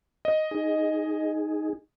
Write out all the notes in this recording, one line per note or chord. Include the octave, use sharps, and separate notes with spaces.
D#5
D#4 G#4